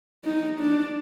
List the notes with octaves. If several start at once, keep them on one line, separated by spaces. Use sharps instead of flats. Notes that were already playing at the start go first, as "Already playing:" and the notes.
D#4
D4